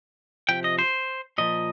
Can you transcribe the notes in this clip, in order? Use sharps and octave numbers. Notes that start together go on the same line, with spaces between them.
C3 F3 G5
D#5
C5
A#2 F3 D#5